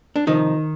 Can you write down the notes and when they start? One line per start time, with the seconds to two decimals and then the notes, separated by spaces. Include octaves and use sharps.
0.16 D4
0.27 C3 D#3 F3 D#4